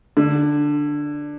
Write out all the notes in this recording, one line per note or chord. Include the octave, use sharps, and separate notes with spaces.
D3